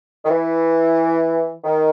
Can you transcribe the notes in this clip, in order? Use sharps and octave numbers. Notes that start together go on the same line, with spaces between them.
D#3
E3
D#3